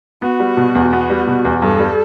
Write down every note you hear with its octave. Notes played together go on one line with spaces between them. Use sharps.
B3 F#4
G3
B2
E2
B3 F#4
G3
B2
E2
G2 A4
G3